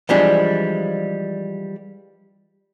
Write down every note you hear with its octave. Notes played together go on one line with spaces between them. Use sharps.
E3 F3 G3 G#3 D4